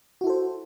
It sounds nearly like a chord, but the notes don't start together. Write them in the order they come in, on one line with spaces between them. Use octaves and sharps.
F#4 E4 A4 C5